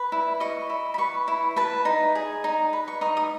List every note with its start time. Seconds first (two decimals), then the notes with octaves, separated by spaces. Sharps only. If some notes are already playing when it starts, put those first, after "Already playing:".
Already playing: B4
0.12 E4
0.40 D#5 C#6
0.70 E4
0.94 B5
0.98 B4 C#6
1.28 E4
1.56 B4 A5
1.85 D#4
2.15 G#4
2.44 D#4
2.73 B4
2.88 C#6
3.01 D#4 D#6
3.17 D#6